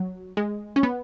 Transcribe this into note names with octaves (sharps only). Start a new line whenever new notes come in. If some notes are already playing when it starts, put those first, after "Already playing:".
Already playing: F#3
G#3
C#4
B3